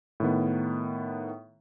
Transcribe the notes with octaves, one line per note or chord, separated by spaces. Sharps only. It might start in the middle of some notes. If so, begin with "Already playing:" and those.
A2 D#3 B3